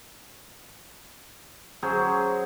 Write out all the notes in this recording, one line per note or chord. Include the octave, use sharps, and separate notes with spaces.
F#3 C#4 G#4 C5